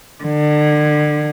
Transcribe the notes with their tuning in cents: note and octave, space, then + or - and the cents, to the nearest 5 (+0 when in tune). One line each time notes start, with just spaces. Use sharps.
D3 +35